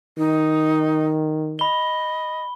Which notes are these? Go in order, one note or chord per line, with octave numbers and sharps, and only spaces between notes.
D#3 D#4
D#5 B5 G7